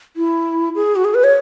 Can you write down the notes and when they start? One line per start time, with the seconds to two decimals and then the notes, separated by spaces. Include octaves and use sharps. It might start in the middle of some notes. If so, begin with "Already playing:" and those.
0.16 E4
0.75 G#4
0.96 F#4
1.05 G#4
1.14 B4
1.24 C#5